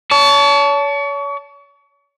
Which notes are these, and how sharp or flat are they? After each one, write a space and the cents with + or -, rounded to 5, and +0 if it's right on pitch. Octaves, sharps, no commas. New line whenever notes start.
C#5 +35 A5 -10